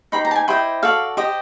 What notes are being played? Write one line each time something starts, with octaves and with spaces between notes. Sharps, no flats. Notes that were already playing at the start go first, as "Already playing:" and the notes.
D#4 G4 C5 B5
A#5
A5
G#5
E4 G4 C5 D#5 G5
F#4 A4 D5 F5
G4 C5 D#5